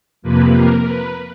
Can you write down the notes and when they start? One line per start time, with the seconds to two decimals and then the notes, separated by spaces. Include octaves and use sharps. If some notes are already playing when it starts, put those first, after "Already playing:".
0.22 F2 C3 F3 A#3 B4
0.53 A#4
0.84 B4